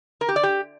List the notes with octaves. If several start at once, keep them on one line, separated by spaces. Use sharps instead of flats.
A#4
G4
D5
G4